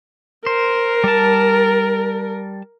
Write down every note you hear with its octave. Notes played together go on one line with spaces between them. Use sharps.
A#4 C5
G3 A5